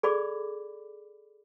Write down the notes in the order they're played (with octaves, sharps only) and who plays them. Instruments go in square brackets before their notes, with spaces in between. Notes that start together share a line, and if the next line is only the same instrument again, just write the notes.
[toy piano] G#4 A4 D5 B5 D6